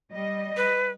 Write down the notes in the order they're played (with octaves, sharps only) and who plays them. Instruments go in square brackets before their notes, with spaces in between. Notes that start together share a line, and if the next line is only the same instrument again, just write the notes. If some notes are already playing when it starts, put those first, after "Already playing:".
[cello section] G3 D#5
[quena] B4